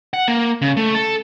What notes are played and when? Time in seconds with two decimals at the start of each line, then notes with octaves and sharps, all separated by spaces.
0.14 F#5
0.28 A#3
0.62 C#3
0.77 A3
0.95 A4